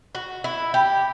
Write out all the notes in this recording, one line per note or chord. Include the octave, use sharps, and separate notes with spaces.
F#4
E4
G4